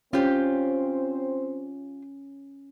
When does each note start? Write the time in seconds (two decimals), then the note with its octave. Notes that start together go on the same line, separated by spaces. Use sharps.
0.13 C4 C#4 F4 G4 C5